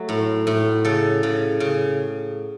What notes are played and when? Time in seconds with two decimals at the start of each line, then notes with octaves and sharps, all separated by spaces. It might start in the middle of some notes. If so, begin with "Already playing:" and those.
Already playing: F#3 A3 F#4
0.09 A2
0.47 A2
0.84 C#3 A4
1.23 C#3
1.60 C#3